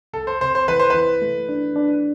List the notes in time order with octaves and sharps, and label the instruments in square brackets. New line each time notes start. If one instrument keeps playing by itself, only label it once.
[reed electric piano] C2 [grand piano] A4
[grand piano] C5
[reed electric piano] C3 [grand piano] C5
[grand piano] C5
[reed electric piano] E3 [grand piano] B4
[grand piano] C5
[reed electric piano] E3 [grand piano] B4
[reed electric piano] A3
D4
D4